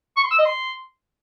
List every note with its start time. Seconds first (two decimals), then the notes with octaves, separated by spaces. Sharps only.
0.17 C#6
0.24 C6
0.31 E6
0.38 D#5
0.45 C6